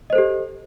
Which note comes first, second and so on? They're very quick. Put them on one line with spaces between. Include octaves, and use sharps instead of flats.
D#5 C5 A4 G4